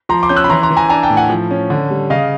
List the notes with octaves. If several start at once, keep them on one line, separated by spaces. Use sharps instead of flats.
F3 A#5 C6
C6 D6
C#4 G6
E6 F#6
B5
E3 A#5 C6
A#5 C6
E3
G#5 A#5
D4 G#5 A#5
G5 A5
A2
F#5 G#5
F3
C#4
D3
G3
C#3 D#5 F5